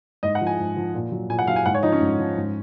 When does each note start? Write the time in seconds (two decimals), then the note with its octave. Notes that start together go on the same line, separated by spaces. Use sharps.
0.23 G#2 D#5
0.35 F#5
0.41 F3
0.47 G#5
0.58 G#2
0.76 F3
0.94 A#2
1.12 F#3
1.30 A#2 G#5
1.39 F#5
1.47 F#3 F5
1.56 G#5
1.65 G#2 F#5
1.74 C#5
1.83 F3 D#4
1.92 C#4
2.01 G#2
2.19 F3
2.37 G#2